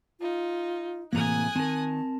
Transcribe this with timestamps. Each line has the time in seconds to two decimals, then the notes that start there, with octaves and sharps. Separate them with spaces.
0.20 D#4 F4
1.13 A2 C3 E3 A#3 G#5 A#5 D#6 F#6
1.56 D#3 C4 A#4 A5